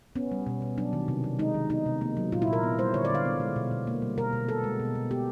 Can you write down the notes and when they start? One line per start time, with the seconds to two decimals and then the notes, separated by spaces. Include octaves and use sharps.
0.16 B3 C#4
0.32 G3
0.47 B2
0.62 B2
0.78 F#3 D4
0.93 D#3
1.08 C3
1.24 C3
1.39 G#3 D#4
1.54 D#3
1.70 B3 D#4
1.86 C3
2.01 A#3
2.17 F#3
2.32 A#2 F4
2.42 E4
2.47 A#2
2.53 A#4
2.63 B3
2.78 G3 C5
2.94 D3 C#5
3.05 D3 D5
3.15 F5
3.25 B3
3.40 G#3
3.56 B2
3.71 B2
3.87 A#3
4.02 G3
4.18 B2 A#4
4.33 B2
4.49 B3 A4
4.64 G#3
4.80 B2
4.95 B2
5.11 B3 G4